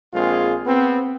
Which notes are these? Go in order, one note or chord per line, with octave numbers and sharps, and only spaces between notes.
A#1 G#3 C4 F4 G#4
B3 C4